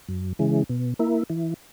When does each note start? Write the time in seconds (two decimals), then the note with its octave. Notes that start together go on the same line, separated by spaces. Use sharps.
0.09 F#2
0.39 C#3 E3 G#3
0.69 B2
0.99 A#3 E4
1.30 E3